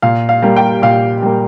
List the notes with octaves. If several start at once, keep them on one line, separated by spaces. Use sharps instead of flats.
A#2 F5
F5
G3 A#3
G5
A#2 F5
G3 A#3